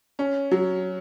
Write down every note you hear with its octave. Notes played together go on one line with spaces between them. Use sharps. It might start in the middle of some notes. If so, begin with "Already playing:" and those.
C#4
F#3